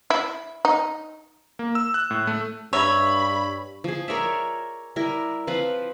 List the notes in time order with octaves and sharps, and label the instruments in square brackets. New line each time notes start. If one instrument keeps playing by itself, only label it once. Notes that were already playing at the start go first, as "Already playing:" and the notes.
[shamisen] E4
D#4
[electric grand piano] A#3
E6
F#6
A2
A3
[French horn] G2 [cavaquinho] C#5 E5 [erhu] B5
[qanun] F3 G#4
A#4 C#5 D5 E5
G3 E4 A#4
F3 C4 F4 B4